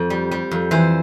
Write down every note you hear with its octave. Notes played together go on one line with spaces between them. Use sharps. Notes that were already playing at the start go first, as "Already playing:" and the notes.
Already playing: F2
G3
G3
F2
E3 C5